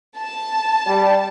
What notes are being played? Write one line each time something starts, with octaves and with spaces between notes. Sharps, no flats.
A5
G3